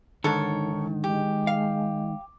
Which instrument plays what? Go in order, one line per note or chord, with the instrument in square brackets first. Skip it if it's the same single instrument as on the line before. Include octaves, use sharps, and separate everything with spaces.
[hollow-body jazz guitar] G#2 D3 [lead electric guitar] D#3 [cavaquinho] A4 A#4 C#5
[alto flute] G#3 [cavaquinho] G4
[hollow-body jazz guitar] F5